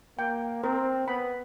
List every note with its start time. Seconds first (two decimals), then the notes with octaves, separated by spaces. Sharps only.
0.18 A#3 G5
0.63 C4 A#4
1.08 B3 B5